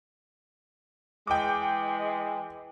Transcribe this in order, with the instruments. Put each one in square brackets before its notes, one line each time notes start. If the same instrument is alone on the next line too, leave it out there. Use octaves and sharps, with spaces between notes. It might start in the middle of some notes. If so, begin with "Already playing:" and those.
[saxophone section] E3 G#3 [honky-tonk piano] G5 D6